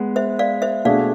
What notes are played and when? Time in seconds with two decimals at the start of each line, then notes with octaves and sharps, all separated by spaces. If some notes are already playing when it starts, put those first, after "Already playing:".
Already playing: G#3 B3
0.16 C5 E5
0.39 D5 F5
0.62 C5 E5
0.85 B2 A3 D4 G#4 D5 F5